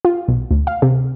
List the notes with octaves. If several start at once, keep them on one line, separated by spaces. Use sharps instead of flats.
F4
B1
D2
F5
C3